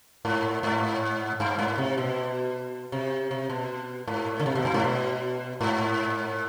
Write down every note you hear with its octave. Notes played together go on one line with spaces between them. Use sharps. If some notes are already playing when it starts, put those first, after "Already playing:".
G#2
G#2
G2
G#2
C3
B2
C3
C3
B2
G#2
D3
C3
B2
G2
G#2
B2
G#2